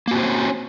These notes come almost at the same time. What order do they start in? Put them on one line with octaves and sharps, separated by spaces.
A#3 F#4 C4 C5 C#4